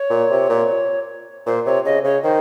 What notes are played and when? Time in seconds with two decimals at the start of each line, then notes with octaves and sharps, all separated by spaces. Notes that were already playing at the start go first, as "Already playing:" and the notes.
Already playing: C#5
0.10 A#2
0.31 C3
0.49 A#2
1.46 A#2 C5
1.65 C3 C#5
1.85 C#3 D#5
2.04 C#3 C#5
2.23 D#3 C5